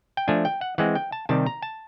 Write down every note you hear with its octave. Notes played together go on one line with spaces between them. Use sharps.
G5
F3 A3 D4 G#5
G5
F#5
E3 G#3 C4 F#5
G5
A5
C3 D#3 G3 A5
A#5
A5